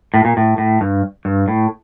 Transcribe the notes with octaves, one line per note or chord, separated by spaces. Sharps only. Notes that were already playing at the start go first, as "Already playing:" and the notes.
A2
A#2
A2
A2
G2
G2
A2